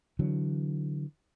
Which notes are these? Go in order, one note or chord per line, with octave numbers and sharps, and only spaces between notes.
D3 E3 F#3